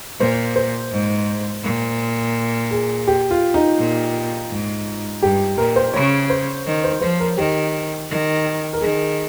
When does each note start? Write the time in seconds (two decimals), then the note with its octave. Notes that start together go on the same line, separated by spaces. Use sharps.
0.19 A#2 C5
0.56 C5
0.92 G#2
1.63 A#2
2.71 G#4
3.08 G4
3.31 F4
3.54 D#4
3.79 A#2
4.51 G#2
5.22 G2 G4
5.58 A#2 A#4
5.76 C5
5.94 C#3 C#5
6.30 C5
6.66 D#3
6.84 C5
7.01 F3 C5
7.20 A#4
7.37 D#3 G4
8.10 D#3
8.73 A#4
8.81 D#3 G#4